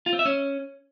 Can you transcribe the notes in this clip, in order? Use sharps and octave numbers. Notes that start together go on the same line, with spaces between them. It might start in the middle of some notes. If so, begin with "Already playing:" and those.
F4
C4
E5
C#4